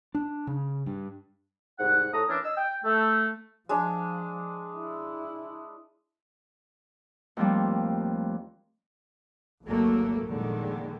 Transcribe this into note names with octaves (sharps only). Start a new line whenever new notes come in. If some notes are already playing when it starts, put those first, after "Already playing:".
D4
C#3
G2
C2 G#2 F#5
A2 A3 A#5 D#6
E3 C#4 D4 E4 A#4
D#5 E6
G5
A3
F3 G#3 D4
E4
D#2 F3 G3 A3 C4
G#1 D2 F#3 A3 A#3
G1 F2 A#2 D3 D#3 G#3